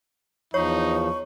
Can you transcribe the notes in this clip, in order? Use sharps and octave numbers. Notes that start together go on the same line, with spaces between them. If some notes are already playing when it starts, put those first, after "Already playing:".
E2 F3 D#4 C#5 C#6